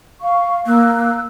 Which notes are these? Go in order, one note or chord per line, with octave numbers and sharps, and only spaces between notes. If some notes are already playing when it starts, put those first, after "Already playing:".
F5 C#6
A#3 E6 F#6